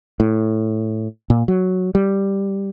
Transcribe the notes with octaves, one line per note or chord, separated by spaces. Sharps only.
A2
A#2
F#3
G3